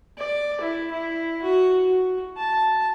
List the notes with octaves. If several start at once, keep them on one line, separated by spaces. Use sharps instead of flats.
D5
E4
E4
F#4
F#4
A5